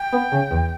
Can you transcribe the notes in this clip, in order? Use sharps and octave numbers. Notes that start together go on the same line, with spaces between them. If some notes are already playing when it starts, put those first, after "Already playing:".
Already playing: G5
B3
C#3
E2